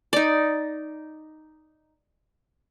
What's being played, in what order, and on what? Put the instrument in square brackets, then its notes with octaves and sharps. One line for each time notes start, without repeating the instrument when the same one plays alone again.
[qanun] D#4 D5